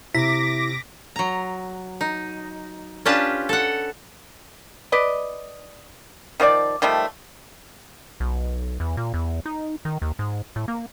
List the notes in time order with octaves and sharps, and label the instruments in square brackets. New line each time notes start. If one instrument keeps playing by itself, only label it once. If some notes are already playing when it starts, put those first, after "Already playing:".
[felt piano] C3 [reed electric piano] E4 [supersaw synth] D6 A#6 [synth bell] B6
[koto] F#3 A#5
D#4
C#4 D4 F4 G4 B4 A5
A4 F#5
[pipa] B4 D5 D#5
D#3 F3 F#4 D5
D#3 F3 G3 A3
[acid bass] B1
E2
A#2
E2
D#4
D#3
D#2
G#2
A2
A#3